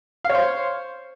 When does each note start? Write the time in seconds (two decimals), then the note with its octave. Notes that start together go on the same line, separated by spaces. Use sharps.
0.25 F5
0.29 C#5
0.34 C5